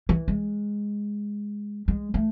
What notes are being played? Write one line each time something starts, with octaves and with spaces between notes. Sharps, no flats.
E3
G#3
G#3
A3